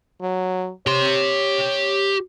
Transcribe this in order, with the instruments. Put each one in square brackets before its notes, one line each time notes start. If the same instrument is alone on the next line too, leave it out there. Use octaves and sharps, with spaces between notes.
[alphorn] F#3
[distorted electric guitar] G4 C6 [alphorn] C#5